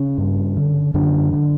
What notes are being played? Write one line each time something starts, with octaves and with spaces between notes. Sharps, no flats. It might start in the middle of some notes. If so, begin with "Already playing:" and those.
Already playing: C#3 C#4
G2
D3
F#2 D3 D4
D3